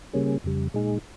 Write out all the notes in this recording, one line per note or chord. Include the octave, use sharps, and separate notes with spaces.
C#3 G3 A#3 C#4 G#4
F2 C#3 G3
A#2 G#3 D#4 G#4